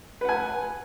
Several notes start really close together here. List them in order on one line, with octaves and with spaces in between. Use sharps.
B4 F#5 G#5